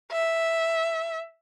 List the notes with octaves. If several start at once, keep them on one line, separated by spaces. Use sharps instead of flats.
E5